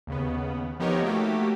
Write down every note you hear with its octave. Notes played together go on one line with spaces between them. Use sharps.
D#2 C#3 B3
F3 B3 D#4 G4 A#4 C#5
A3 A#3 F#4 G4